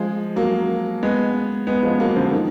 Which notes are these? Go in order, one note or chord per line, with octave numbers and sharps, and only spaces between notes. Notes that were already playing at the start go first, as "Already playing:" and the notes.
Already playing: F3 G#3
F#3 A#3
G#3 B3
G#3 B3
F3 G#3
F#3 A#3
D3 F3
D#3